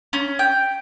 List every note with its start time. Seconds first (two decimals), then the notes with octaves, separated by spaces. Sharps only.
0.13 C#4
0.39 G5